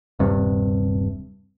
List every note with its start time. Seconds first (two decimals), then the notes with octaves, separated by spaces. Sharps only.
0.19 D#1 G2 C3